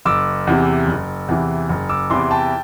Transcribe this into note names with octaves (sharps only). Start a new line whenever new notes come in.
F#1 D6 E6
E2 C3 E3
F#1
E2 C3 E3
F#1
D6 E6
E2 C3 E3 C6 D6
G5 A5